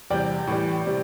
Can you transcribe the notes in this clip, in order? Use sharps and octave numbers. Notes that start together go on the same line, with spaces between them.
E2 C3 G3 D5 G5
A2 E3 G3
C3 G3